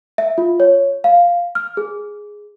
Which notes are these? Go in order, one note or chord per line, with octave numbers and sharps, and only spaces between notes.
E5
F4
C#5
F5
F6
G#4